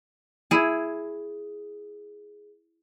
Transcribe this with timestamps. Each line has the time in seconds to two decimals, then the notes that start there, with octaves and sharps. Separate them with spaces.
0.51 E4 G#4